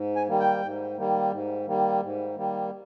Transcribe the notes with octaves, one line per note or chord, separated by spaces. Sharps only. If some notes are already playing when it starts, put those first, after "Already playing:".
Already playing: G#2
G#5
D#3 G3 A#3
G5
G#2
D#3 G3 A#3
G#2
D#3 G3 A#3
G#2
D#3 G3 A#3